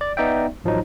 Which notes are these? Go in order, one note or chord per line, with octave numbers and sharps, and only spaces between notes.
D5
B3 D#4 D5 E5 G5
A1 F3 F#3 D#4